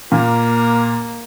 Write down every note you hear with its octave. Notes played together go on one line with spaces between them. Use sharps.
A#2 A#3